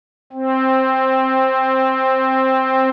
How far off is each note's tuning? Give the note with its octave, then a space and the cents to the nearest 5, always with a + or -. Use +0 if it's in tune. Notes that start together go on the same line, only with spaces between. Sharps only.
C4 +5